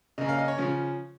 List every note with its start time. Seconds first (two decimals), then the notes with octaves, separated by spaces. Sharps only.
0.18 C#3 A#3 C#4 D#5
0.29 F5
0.38 D#5
0.48 C#5
0.58 C#3 F3 C#4